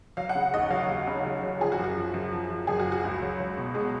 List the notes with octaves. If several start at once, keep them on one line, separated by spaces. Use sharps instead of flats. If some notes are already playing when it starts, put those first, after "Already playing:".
F#3 F5
F#5
C#3
D#2 D#5
F#3 F5
D#2
C#3
F#3
F#3
F3 G#4
F#4
F#2
F#4
F3
F#2
F3
F3
F#2 G#4
F#4
F3
F#4
C#2
F#3
F#3
B2
B2 G#3